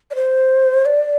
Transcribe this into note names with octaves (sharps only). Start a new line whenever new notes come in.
D5
C5
D5